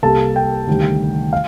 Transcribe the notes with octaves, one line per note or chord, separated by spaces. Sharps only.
C2 C3 G3 A#3 A4 A5
G5
D2 C3 D#3 G3
F5